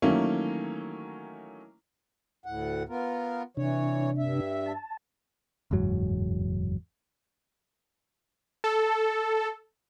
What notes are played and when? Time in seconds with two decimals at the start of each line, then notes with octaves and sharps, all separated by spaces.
0.02 D#3 E3 F#3 A3 A#3 C#4
2.46 D2 A2 F#5
2.89 B3 F4 A#4
3.57 C3 E3 D4 C#5
4.18 G2 E5
4.66 A5
5.71 F#1 E2 G#2 F#3
8.64 A4